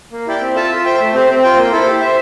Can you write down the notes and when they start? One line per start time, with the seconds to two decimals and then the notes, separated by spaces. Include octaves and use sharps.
0.12 A#3
0.27 E4 G4 D5 G5
0.41 C4
0.55 F4 A4 E5 A5
0.71 F4
0.85 C5 E5 G5
1.00 A3
1.13 C4 G4 C5
1.29 C4
1.43 F4 C5 G5
1.57 A#3
1.72 E4 A4 C5
1.86 G4
2.01 C5 E5